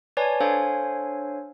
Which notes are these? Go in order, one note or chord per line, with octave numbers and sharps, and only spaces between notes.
B4 C#5 D5 G#5 A5
D4 A4 C5 C#5 F5 G#5